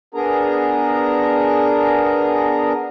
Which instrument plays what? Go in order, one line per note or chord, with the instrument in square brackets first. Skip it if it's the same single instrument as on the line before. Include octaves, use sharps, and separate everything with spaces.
[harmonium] B3 D4 G#4 A#4 A#5